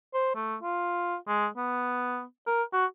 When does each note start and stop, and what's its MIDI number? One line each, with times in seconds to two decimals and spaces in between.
0.14 0.32 72
0.35 0.56 57
0.63 1.16 65
1.28 1.47 56
1.57 2.23 59
2.47 2.63 70
2.73 2.85 66